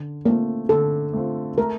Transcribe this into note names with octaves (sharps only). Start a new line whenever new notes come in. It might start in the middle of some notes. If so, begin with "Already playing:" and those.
Already playing: D3
A3 A#3 C4 F4
D3 A4
A3 C4 F4
A3 A#4